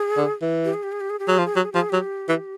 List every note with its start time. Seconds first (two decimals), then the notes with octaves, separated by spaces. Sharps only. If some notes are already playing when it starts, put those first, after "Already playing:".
Already playing: G#4
0.17 D3
0.42 E3
0.65 G4
0.74 G#4
0.83 G4
0.92 G#4
1.00 G4
1.10 G#4
1.19 G4
1.27 F#3 G#4
1.37 F3 G4
1.45 G#4
1.55 F#3 G4
1.63 G#4
1.72 F3 G4
1.81 G#4
1.90 F#3 G4
2.29 E3